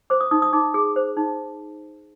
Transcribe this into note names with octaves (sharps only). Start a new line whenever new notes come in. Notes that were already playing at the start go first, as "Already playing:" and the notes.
C5 D6
D#6
D#4 D#6
D#6
D#4 D6
G#4
C5
D#4